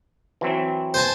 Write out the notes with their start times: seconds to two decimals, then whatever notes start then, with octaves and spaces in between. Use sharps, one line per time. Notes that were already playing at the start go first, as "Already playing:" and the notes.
0.41 E3 F#3 C4
0.94 C5 G#5 A5